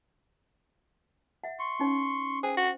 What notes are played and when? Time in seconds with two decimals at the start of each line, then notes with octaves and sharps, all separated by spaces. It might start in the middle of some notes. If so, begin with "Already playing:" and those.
1.44 E5 F#5
1.59 C6 C#6
1.79 C#4 D#4 C#5
2.43 G#4 C5 G5
2.57 F#4